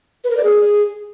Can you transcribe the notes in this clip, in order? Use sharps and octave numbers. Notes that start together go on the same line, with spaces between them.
B4
A#4
D5
G#4